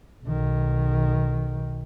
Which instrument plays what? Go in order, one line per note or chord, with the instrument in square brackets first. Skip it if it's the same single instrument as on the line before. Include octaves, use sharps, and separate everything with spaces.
[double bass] B1 D#3